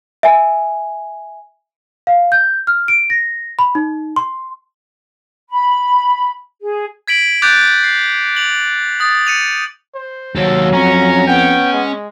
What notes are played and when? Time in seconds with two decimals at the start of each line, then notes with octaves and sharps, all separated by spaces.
0.23 E5 G#5
2.07 F5
2.32 G6
2.67 F6
2.88 D7
3.10 A#6
3.59 B5
3.75 D#4
4.16 C6
5.49 B5
6.62 G#4
7.08 G#6 B6 D7 F#7
7.42 D6 F#6 G6 A6 D7
7.84 C7
8.36 F7 F#7
9.00 D#6 A6
9.27 C#7 D#7 F7
9.94 C5
10.36 D#2 F#3 A4
10.73 F2 C#4 A#5
11.27 B3 G5
11.73 G#3